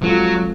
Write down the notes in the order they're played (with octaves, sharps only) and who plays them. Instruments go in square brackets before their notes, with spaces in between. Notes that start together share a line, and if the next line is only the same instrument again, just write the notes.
[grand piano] F3 G#3 C4 F4 A4 [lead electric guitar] F#3